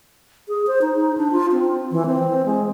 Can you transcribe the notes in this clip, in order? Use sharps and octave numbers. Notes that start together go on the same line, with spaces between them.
G#4
C5
D#4
D#4
D4
F4
C4
E3
C4
G#3